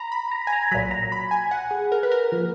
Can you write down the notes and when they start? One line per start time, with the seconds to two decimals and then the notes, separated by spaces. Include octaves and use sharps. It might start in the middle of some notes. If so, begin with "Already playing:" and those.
Already playing: A#5 B5
0.12 B5
0.32 A#5
0.47 G#5
0.52 A#5
0.71 B1 A#2 F#3 B5
0.91 A#5
1.12 B5
1.31 G#5
1.51 F#5
1.71 G#4
1.92 A#4
2.03 B4
2.12 A#4
2.32 F3 A#3